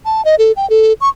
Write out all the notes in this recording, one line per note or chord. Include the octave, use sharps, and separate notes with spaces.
A5
D#5
A4
G5
A4
C#6